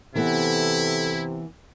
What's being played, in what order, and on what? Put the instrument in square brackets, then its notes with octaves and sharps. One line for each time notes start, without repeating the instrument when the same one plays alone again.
[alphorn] C3 [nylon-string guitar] E3 B3 [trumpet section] E4 [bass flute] A4